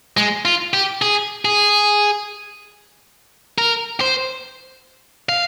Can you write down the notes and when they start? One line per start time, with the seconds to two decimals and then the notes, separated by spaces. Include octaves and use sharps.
0.17 G#3
0.45 F4
0.74 G4
1.02 G#4
1.45 G#4
3.58 A#4
4.01 C5
5.29 F5